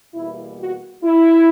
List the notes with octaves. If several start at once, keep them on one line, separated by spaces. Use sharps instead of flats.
E2 B2 G3 A#3 E4
F#4
E4